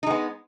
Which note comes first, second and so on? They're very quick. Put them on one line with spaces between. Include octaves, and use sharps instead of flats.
D#4 G#3 B3